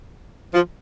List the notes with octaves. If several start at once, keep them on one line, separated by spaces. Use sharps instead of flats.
F3